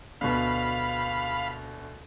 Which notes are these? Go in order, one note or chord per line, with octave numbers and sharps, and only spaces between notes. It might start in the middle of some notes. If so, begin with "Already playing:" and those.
D2 B2 F5 B5